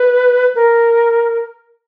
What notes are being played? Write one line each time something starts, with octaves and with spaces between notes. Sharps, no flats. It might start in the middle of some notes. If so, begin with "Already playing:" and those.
Already playing: B4
A#4